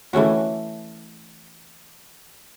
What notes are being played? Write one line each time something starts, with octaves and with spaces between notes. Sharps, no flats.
E3 A3 C#4 F#4